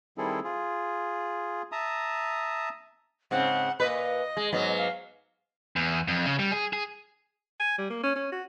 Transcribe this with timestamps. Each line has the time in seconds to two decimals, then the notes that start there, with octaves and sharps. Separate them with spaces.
0.18 D#3 G3 C4 E4 G#4 A4
0.44 F4 G#4
1.72 E5 A5 A#5 D#6
3.31 G#2 C#3 C4 F#5
3.80 A#2 B4 D#5
4.37 G#3
4.53 G#2 F#3 B3 D#5
4.77 F5
5.76 E2
6.08 F2
6.26 C#3
6.39 G3
6.52 G#4
6.73 G#4
7.60 G#5
7.78 G3
7.90 A#3
8.04 C#4
8.16 C#4
8.32 F#4